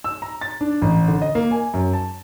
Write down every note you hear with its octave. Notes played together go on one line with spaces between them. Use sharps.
E6
A#5
A6
D4
A1
D3
D#5
A#3
G#5
F#2
A5